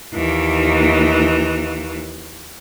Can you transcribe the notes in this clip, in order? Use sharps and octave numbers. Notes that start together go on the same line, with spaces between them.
D#2 E3